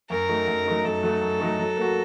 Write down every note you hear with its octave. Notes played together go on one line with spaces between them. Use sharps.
F#2 A#4
F#3 A3 D#4
F#2
F#3 A3 D#4
F#2 A4
F#3 A3 D#4
F#2
F#3 A3 D#4
F#3
A#3 F#4